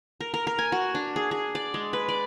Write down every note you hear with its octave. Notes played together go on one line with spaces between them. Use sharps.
A#4
A#4
A#4
G#5
F#4
D4
G#4
G#4
D5
G#3
B4
D5